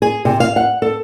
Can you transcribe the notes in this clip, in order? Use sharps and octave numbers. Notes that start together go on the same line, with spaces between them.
G#4
C3
F5
F#5
A4